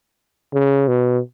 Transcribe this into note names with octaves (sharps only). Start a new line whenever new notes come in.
C#3
B2